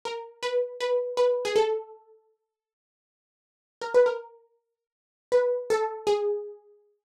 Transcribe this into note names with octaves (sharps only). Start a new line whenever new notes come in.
A#4
B4
B4
B4
G#4
A4
A#4
B4
A#4
B4
A4
G#4